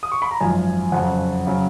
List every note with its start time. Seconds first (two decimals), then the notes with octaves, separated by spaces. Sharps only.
0.03 D#6
0.12 C#6
0.22 B5
0.31 A#5
0.40 G#1 F#2 F3 G#5
0.92 F2 C#3 F#3 F#5
1.47 C#3 F#3